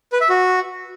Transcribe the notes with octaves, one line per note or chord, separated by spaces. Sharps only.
B4
E5
F#4